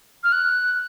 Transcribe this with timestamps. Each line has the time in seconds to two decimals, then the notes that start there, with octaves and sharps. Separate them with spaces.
0.24 F6
0.32 F#6